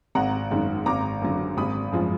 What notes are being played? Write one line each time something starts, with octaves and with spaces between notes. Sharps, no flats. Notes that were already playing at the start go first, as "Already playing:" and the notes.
G#1 F#5 A#5
F#2 D#3 G#3
G#1 A#5 D6
F#2 D3 F#3
G#1 B5 D#6
F#2 F3 G#3